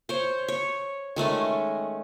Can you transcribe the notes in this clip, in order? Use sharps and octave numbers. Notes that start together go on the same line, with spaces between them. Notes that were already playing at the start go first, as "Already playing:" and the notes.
C5 C#5
C#5
D#3 G#3 A3 C#4